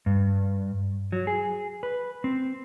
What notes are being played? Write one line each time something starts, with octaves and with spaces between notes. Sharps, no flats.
G2
F#3
G#4
B4
C4